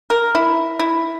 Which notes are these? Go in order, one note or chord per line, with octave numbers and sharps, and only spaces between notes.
A#4
E4
E4